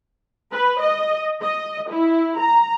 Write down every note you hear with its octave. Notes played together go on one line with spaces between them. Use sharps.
B4
D#5
D#5
E4
A#5